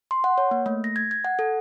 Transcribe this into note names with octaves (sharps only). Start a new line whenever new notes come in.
C6
F#5
C#5
A#3
A3
A#6
G#6
G#6
F#5
A4